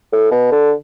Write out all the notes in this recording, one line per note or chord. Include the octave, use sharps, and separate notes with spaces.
A2
B2
D3